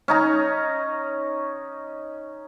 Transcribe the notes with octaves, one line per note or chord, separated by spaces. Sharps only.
C#4 D#4 A#5